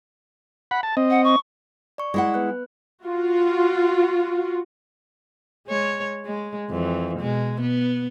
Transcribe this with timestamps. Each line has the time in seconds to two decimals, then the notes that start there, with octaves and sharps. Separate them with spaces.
0.71 F#5 B5
0.83 A5
0.97 C4 D#5
1.10 F#5
1.24 C#6
1.98 D5 C#6
2.14 G#3 E4 F#5
2.34 B3 B4 F#6
3.05 F4 F#4
5.67 G#3 C#5
6.26 G#3
6.69 F2 E3
7.20 B2 G#3
7.61 B3